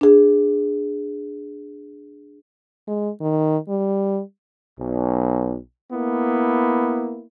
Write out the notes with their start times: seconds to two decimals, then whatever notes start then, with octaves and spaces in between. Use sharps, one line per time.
0.01 D4 G#4
2.87 G#3
3.21 D#3
3.68 G3
4.77 B1
5.91 A#3 B3 E4